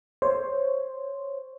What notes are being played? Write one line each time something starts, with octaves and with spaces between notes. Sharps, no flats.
C5 C#5